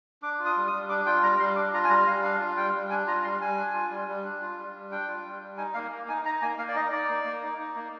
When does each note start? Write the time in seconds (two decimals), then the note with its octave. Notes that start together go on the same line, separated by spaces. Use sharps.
0.22 D4 D6
0.40 F4
0.45 D#6
0.57 G3
0.67 D#6
0.72 G3
0.89 D4 D6
1.06 F4 G5
1.23 G3 A#5
1.40 G3 C6
1.56 D4 D6
1.73 F4 A#5
1.84 G#5
1.90 G3 A#5
2.07 G3 F5
2.23 D4 F5
2.40 F4
2.57 G3 G5
2.74 G3
2.90 D4 G#5
3.07 F4 A#5
3.24 G3 C6
3.40 G3 G#5
3.57 D4
3.74 F4
3.90 G3
4.08 G3
4.24 D4
4.42 F4
4.58 G3
4.74 G3
4.92 D4 G5
5.08 F4
5.25 G3
5.42 G3
5.57 D#4 G#5
5.74 A#3 F5
5.91 A#3
6.08 D#4 G#5
6.25 D#4 A#5
6.41 A#3 G#5
6.59 A#3 F5
6.69 D5
6.75 D#4 D#5
6.92 D#4 D5
7.09 A#3
7.25 A#3
7.43 D#4
7.58 D#4
7.75 A#3